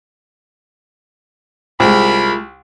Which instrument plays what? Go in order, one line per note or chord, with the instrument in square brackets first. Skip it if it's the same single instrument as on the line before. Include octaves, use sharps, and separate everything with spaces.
[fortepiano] C2 [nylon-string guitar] G#3 F4 [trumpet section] A#4 B5